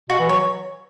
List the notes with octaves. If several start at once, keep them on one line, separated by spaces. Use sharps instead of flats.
B2 F#4
E3
F#3 C#5